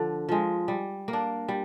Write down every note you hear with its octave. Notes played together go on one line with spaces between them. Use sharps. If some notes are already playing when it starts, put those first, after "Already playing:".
Already playing: D3 F3
F3 G#3
G3
A#3
D4
G3